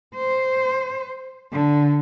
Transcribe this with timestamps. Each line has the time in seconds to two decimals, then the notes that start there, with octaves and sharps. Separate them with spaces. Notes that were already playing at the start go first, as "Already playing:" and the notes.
0.15 C5
1.53 D3